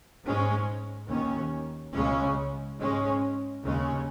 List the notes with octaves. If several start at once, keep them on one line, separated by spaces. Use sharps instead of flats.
G#2 G#3 C#4
D#2 D#3 C#4
C#2 C#3 G#3 C#4
G#2 G#3 C#4
D#2 C#3 G#3 C#4